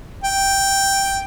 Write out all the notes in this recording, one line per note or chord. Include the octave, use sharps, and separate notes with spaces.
G5